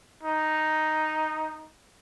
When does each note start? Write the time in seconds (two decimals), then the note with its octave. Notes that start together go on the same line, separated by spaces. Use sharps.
0.24 D#4